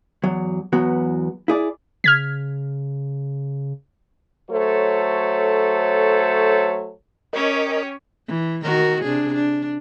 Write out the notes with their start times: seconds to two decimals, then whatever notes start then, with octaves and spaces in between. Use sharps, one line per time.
0.24 E2 F#3
0.73 E2 F#3 B3 F#4
1.48 E4 G#4 D5
2.04 C#3 F6 G#6 B6
4.50 F#3 A3 A4 C5 C#5
7.33 C#4 G4 A#4 C#5 D#5
8.28 E3
8.63 D#3 F#4 A#4
9.03 C3 D4 G#4
9.34 D4